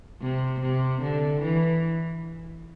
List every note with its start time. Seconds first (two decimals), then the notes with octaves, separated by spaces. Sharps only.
0.22 C3
0.62 C3
1.02 D3
1.43 E3